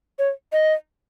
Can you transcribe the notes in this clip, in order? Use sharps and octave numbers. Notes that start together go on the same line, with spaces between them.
C#5
D#5